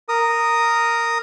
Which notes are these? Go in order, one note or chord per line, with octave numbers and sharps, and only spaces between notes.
A#4 D#6